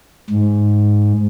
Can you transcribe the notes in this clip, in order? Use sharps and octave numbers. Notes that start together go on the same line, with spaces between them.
G#2